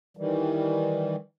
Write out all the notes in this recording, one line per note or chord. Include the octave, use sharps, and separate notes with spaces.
D#3 E3 G3